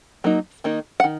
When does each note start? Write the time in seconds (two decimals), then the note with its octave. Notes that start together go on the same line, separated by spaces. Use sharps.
0.24 F#3 A#3 D#4
0.64 D#3 A#3 D#4
1.00 F#5
1.04 D#3